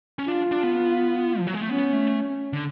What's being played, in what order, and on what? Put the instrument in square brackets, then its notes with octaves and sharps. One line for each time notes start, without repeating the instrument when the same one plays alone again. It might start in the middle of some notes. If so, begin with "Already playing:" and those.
[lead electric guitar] C#4
[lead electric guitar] D4 [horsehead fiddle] F4
[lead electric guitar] D4
B3
F3
F#3
G#3
A3
[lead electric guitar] B3 [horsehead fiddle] C#4
[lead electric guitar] A3
D3